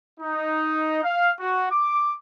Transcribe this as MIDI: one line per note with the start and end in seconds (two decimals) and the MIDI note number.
0.20 1.04 63
1.04 1.31 77
1.40 1.70 66
1.72 2.15 86